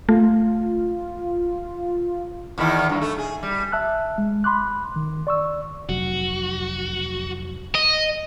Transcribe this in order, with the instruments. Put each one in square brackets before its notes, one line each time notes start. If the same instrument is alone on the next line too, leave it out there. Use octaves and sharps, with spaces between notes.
[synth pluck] A3 [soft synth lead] F4
[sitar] E2 D#3 E4
G2 G#3 A#3
A3
G#4
G3
[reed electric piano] E5 A5 E6 F#6
G#3
B5 C6 D6 F#6
D#3
D5 C#6 E6
[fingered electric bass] F1 F#3 [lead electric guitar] F#4
[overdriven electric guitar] D#5